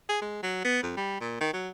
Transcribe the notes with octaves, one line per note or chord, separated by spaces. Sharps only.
G#4
G#3
F#3
B3
F2
G3
A#2
D#3
F#3